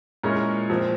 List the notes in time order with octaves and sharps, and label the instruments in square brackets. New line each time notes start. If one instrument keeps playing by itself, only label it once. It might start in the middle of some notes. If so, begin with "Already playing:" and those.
[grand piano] A#2 G#3 C#4 E4 A#4
A#2 F3 C4